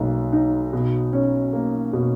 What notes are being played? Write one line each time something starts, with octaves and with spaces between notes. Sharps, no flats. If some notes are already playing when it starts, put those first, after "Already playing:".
Already playing: B1 A#3
D#4
B2
C#4
A#3
B2